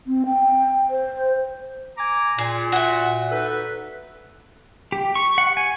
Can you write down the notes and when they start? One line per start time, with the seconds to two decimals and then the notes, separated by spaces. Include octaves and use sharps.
0.07 C4
0.26 G5
0.90 C5
1.98 G#5 A#5 D6
2.38 A#2 G#4
2.72 F#4 E5
3.31 D#4 A4 B4
4.92 G4
5.15 C#6
5.38 F#5
5.57 G#5